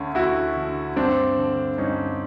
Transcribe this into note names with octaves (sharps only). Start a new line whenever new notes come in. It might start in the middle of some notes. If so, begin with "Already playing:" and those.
Already playing: D2 D3 C#4
D2 E4 F#4
D3
G2 C4 D4
D3
G2 C#4 D#4